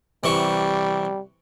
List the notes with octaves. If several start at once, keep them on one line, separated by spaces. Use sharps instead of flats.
C3 E3 G3 C#6